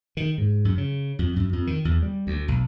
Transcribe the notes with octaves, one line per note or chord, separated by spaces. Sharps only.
D#3
G#2
F#2
C#3
F2
F#2
F2
D#3
E2
G3
D2
B1